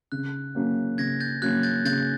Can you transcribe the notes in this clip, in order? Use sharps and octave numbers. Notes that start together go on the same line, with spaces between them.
C#3 F#6
F#3 A#3 C#4
C#3 G#6 A#6
G6 A6
F#3 A#3 C#4 F#6 G#6
G6 A6
C#3 G6 A6